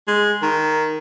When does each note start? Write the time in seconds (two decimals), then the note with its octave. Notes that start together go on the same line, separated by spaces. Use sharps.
0.08 G#3
0.42 D#3